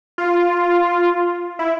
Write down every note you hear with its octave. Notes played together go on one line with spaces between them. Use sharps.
F4
E4